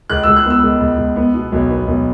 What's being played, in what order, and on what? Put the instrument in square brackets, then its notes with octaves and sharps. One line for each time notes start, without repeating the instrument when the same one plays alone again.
[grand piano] C#2 F#6
C#2 E6
F#6
B3
E6
C#2
C#2
C#2
B3
B2
B1
B3
B1